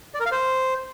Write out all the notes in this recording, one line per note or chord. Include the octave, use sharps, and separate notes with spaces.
D5
A#4
F5
C5